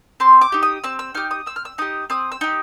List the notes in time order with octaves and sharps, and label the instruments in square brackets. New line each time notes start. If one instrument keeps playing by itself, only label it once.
[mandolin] C4 C6
D6
D#4 G4
D#6
C4 E6
E6
D#4 G4 F6
D#6
C4 E6
F6
E6
D#4 G4 D#6
C4 D#6
E6
D#4 G4